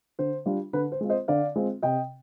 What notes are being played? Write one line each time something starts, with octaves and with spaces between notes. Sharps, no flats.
D3 C5
G3 D4 F4
D3 B4
C5
G#3 C4 F4
C5 D#5
D3 D5 F5
G#3 C4 F4
C3 D#5 G5